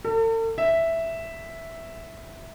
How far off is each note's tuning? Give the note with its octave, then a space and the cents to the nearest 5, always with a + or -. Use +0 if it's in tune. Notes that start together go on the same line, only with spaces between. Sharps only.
A4 +45
E5 +0